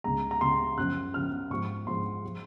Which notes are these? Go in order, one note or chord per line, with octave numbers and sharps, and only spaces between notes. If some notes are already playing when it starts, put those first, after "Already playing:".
C#2 C#3 G#3 A#5
A#5
C#2 C#3 G#3 C6
F#2 C#3 F3 F#6
F#2 C#3 F3 F6
G#2 F3 G#3 C#6
G#2 F3 G#3 C6
F3 G#3